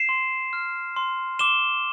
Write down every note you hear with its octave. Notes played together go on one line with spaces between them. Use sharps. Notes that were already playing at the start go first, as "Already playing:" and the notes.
Already playing: C7 E7
C6
F6
C6
D6 E7 G7